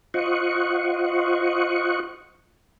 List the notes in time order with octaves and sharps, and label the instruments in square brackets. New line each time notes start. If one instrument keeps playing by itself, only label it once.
[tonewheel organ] F4 C5 D#5 F#5 C#6